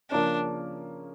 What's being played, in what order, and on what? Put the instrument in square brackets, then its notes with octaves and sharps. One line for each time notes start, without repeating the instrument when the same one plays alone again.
[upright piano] C#3 F3 A#3 C#4 [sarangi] D4